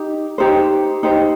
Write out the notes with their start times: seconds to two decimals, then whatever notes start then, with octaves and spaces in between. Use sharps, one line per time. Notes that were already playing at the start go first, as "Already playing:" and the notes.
Already playing: D#4 G4
0.38 D#4 G4 C5
1.03 D#4 G4 C5